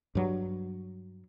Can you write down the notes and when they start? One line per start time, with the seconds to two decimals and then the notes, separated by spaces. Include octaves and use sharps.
0.15 G2 F#3